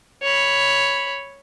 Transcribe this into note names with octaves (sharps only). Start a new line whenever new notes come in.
C#5 B5